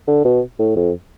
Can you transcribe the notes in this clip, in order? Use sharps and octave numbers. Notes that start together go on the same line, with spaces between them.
D3
B2
A2
F2